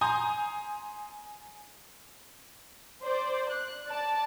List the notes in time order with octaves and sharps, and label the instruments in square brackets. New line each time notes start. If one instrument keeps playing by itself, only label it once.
[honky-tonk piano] G#5 A#5 C6 D#6 G6
[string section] C5 D5
F#6
D5 A5